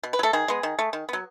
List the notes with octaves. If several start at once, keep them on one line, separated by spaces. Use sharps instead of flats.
B2
B4
F#3
A3 A4
D#3 G#4
G#3 B3
D#3
A3
D#3
F#3 B3